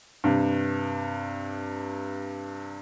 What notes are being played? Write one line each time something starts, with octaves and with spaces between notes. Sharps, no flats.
G2 C3